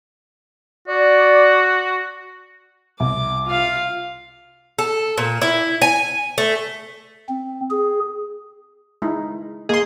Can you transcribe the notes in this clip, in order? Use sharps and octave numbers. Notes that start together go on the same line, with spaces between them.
F#4 D5
C2 D6
F4 F5
A4
A#2
E4
G#5
A3
C4
G#4
G#3 D#4 E4
A#3 G#4 A#4 D#5 C6